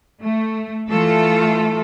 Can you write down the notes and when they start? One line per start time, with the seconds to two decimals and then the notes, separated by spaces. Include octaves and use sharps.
0.22 A3
0.89 E3 A3 F4 A4